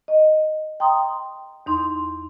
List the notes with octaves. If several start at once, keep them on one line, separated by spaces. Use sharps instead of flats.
D#5
G5 A#5 C6 D#6
E2 D#4 C6